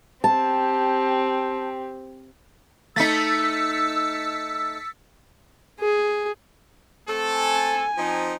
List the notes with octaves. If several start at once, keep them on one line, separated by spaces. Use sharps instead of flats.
C4 G4 A5
A3 D#4 E6 A6 B6 C#7
G#4
A3 C4 A4
G#5
F3 C4 D#4